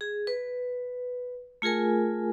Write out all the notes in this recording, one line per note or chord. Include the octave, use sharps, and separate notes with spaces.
G#4
B4
A3 F4 G#4 A#4 G#5